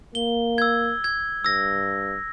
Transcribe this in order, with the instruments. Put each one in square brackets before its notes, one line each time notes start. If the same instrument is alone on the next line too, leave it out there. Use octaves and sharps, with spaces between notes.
[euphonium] A#3 [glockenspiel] G7
[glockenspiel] E6 G#6
G#6
[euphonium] G2 [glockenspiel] E6 A#6